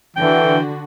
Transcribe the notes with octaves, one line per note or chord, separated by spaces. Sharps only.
D3 E3 F#4 G5